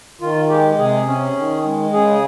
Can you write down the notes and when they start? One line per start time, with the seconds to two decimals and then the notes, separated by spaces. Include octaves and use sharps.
0.21 D#3 F4
0.49 G#3 G4
0.78 C3 G#4
1.07 C#4
1.36 D#3
1.64 G#3
1.93 C#3 G#4